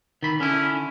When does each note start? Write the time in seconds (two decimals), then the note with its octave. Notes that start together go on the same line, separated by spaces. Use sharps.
0.23 D#3 B5
0.40 D3 C#4 E4